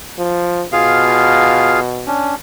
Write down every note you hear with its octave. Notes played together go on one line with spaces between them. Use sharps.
F3
B2 F4 G#4 F5
C#4 D4